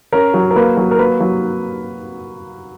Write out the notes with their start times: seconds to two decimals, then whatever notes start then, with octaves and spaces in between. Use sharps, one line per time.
0.12 C#4 A#4
0.34 F#3
0.51 A#4
0.56 A#3 B4
0.77 F#3
0.91 A#4
0.98 A#3 B4
1.20 F#3